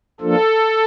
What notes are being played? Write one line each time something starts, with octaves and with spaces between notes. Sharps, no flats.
F3 A#3 D4 F4 A4